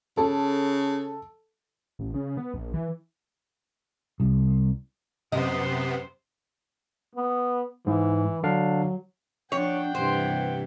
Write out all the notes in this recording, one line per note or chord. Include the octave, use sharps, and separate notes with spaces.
C#3 A4
A1
C#3
B3
A#1
E3
C2
F#2 C3 B3 C5 D#5
B3
G#2 E3
D3 F#3 D4 F5
F3 D4 C#5 F#5 G5
G2 C3 E3 C5